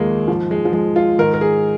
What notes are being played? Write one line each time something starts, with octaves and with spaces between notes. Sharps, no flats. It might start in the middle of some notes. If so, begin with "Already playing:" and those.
Already playing: D#2 D#3 F3 G#3 A#3
G#2 F3
G#3
F3
G#3
F4
G#2 D#3 A#4
A#4
G#4